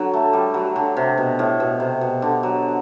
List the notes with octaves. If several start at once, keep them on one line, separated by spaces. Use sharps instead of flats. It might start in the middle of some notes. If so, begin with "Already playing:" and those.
Already playing: D3 F#3
A3
G3
F#3
D3
C3
B2
A2
B2
C3
B2
D3
F#3